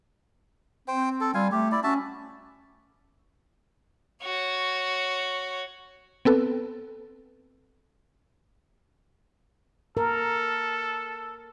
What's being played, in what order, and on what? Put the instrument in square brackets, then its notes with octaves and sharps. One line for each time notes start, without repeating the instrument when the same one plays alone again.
[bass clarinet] C4 [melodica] C5 G5
[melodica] A4
[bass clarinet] G3 [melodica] F4 F5 G#5
[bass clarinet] A3 [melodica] G4
[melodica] E4 D5
[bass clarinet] C#4 [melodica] F#4 E5 A5
[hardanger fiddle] F#4 C#5
[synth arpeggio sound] B3 C4 A4 B4
[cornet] A4 [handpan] A#4